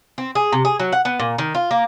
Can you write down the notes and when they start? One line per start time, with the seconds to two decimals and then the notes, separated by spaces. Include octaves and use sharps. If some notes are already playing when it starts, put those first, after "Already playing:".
0.18 C4
0.35 G#4
0.52 C3
0.65 G#4
0.79 F#3
0.92 F#5
1.05 B3
1.19 A#2
1.38 D#3
1.55 F4
1.71 A#3